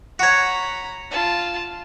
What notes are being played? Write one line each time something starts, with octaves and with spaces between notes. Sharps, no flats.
F#4 C#5 A#5 B5
F4 A5